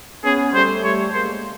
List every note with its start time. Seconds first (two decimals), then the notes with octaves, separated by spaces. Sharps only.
0.24 B3 C#4 G#4
0.54 G3 A3 C5
0.84 G3 A3 C#5
1.13 G#3 A#3 C5